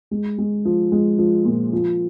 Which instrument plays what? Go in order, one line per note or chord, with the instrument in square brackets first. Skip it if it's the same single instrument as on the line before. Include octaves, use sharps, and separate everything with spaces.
[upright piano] G#3
G#3
F3
G#3
F3
A#2
F3